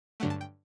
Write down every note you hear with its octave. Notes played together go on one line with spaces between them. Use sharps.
G2 D3 F#3 A3 F#5
A5
G5